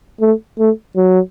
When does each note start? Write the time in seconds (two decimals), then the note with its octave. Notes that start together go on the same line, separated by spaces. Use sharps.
0.21 A3
0.59 A3
0.96 F#3